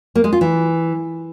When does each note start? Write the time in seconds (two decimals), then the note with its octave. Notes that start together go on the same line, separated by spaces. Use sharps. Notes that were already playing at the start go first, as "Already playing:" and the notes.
0.15 A#3
0.24 G#3
0.33 F4
0.41 E3